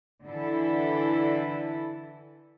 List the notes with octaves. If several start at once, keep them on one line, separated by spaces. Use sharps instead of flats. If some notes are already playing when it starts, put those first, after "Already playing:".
D3 E3 E4 A4